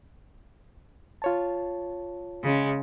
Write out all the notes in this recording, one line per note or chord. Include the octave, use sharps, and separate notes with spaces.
F4 C#5 A5
C#3 G#3